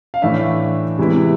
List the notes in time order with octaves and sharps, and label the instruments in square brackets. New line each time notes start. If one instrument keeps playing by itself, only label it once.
[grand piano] F5
A2 E3 A3 D4 E5
C3 E3 G#3 B3 E4